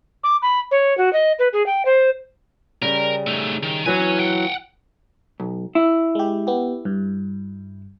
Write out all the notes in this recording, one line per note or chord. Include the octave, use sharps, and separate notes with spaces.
D6
B5
C#5
F#4
D#5
B4
G#4
G5
C5
C#3 G3 A#4
A3 D#4
D#3
E3 F#3 C#5 G#5
F#5 G5
B1
E4
G#3 G4
B3 G4
G2